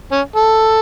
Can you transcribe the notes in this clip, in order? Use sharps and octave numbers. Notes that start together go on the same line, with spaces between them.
C#4
A4